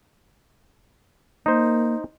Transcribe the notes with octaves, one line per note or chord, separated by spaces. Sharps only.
A#3 D#4 C5